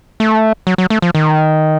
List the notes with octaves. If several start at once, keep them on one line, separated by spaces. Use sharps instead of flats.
A3
F#3
F#3
A3
F3
D#3